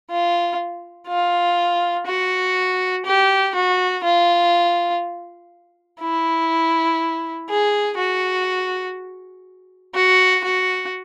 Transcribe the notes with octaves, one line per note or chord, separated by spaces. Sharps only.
F4
F4
F#4
G4
F#4
F4
E4
G#4
F#4
F#4
F#4